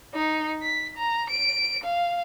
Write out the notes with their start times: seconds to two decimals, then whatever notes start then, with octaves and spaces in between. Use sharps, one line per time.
0.14 D#4
0.62 B6
0.97 A#5
1.30 D7
1.84 F5